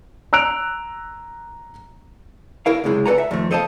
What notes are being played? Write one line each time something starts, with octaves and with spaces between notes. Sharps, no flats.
A#5 E6 F#6 D7 F7
E4 A#4 F5
C#2 F#2 C3 G#3 E4
A4 B4 D5 F#5 G#5 A#5
E5
F2 D#3 A3
A4 C5 D#5 F5 G#5 A5